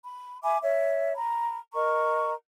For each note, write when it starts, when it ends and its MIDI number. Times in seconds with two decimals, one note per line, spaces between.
0.06 0.37 83
0.43 0.57 76
0.43 0.57 80
0.43 0.57 83
0.43 0.57 86
0.62 1.13 73
0.62 1.13 76
1.15 1.57 82
1.15 1.57 83
1.74 2.32 70
1.74 2.32 75
1.74 2.32 82
1.74 2.32 85